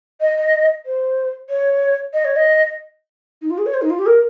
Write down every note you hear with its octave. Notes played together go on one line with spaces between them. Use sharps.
D#5
C5
C#5
D#5
C#5
D#5
D#4
F4
G#4
C#5
C5
D#4
F4
G4
A#4